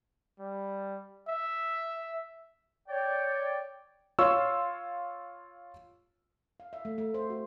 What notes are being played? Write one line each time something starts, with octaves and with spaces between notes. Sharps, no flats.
G3
E5
C#5 D5 G5
F4 C#5 F5 C6 C#6 E6
F5
E5
A3
A3
C5
F#4